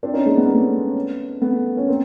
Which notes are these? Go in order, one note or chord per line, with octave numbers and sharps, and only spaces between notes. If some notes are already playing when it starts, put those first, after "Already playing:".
C4 D4
C#4 D#4
G#3 A#3
B3
A#3
A3 B3
A3 B3
C#4
A#3 C4